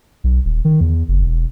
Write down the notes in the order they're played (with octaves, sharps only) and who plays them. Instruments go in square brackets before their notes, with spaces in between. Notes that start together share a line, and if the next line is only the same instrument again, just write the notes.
[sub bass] B1
D#1
D#3
E2
F#1
E1